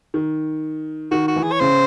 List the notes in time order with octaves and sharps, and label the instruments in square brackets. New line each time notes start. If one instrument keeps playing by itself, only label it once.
[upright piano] D#3
[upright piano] D#3 [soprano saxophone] F#4
[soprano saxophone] F#4
[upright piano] E3
[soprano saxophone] G#4
C#5
[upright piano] C#3 [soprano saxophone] C5